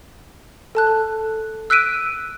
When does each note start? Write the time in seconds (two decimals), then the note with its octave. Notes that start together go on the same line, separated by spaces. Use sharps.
0.75 A4 A5 F#6
0.87 A4
1.70 E6 F#6 B6 D7 D#7